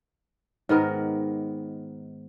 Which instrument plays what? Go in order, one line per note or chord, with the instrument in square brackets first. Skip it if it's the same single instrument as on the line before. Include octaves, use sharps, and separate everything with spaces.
[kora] G#2 D#3 B3 A#4